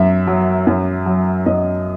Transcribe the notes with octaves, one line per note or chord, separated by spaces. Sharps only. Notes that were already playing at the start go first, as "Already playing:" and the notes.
Already playing: F#2 F#3 E5
F#3
F#2
F#3
F#2 D#5